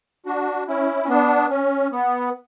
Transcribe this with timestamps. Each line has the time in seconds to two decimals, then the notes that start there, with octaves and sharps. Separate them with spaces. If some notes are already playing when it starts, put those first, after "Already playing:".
0.26 D4 F#4
0.68 C#4 E4
1.04 C#4
1.09 B3 D4
1.50 C#4
1.92 B3